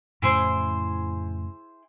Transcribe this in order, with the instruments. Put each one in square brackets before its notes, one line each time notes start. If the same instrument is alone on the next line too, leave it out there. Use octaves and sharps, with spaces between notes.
[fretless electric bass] F2 A2 C#3 [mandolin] E4 G#4 C5